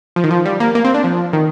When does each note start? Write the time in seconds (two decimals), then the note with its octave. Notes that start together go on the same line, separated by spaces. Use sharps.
0.16 F3
0.24 D#3
0.31 F3
0.46 G3
0.60 A#3
0.75 A#3
0.85 C4
0.94 D4
1.04 F3
1.33 D#3